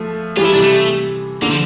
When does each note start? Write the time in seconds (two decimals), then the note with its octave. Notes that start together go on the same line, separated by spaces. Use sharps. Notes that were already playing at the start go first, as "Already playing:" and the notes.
Already playing: F3 A3
0.37 E3 G3 F4
0.45 E4
0.54 C3 E3 D4
0.63 A3
1.42 D3 A#3
1.51 F3